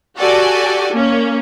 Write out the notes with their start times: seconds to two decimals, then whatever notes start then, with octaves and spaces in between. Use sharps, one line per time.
0.18 F#4 G4 A4 D5 G#5
0.92 A#3 C#4